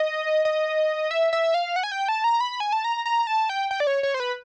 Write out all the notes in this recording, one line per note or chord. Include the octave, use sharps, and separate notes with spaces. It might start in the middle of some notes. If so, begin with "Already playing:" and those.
Already playing: D#5
D#5
E5
E5
F5
F#5
G#5
G5
A5
A#5
B5
G#5
A5
A#5
A#5
A5
G5
G5
D5
C#5
C#5
C5
B4